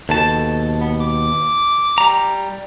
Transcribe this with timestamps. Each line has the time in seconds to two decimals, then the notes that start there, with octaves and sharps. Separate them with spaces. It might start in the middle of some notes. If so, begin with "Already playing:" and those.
0.09 D#2 B2 A4 A5
0.81 B3
1.00 D6
1.98 G3 A#5